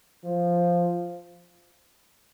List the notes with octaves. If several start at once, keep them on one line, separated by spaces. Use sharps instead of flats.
F3